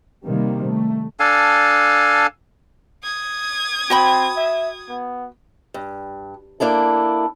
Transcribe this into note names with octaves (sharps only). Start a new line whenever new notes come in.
C3 D#3 G3 A#3
A3
D4 A4 F5 G#5
D#6 G#6
C4 F#4 G5 B5
E5
B3
G2
A#3 D4 E4 A4